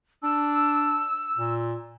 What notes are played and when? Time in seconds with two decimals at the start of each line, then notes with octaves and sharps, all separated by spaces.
0.23 D4 E6
1.38 A#2